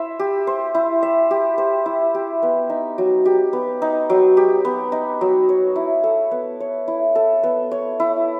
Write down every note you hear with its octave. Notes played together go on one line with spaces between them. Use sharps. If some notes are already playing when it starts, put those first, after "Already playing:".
Already playing: E4 C5 E5
G4
C5
E4
E5
G4
C5
E4
G4
B3
D#4
F#3
G4
B3
D#4
F#3
G4
B3
D#4
F#3
C#5
E4
A4
B3
C#5
E4
A4
B3
C#5
E4